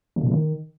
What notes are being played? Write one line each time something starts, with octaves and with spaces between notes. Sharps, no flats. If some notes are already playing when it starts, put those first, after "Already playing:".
D3
A#2
C#3
D#3